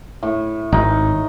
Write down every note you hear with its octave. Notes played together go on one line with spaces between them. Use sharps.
A2
G#1 D#4